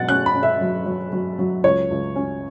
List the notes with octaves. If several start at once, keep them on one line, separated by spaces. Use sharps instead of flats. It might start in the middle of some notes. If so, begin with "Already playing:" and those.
Already playing: B2 F#3 F#5 A6
C#4 F#6
B5
C#4
E5
F#3
F#3
F#3
F#3
C#2 C#5
C#2
C#4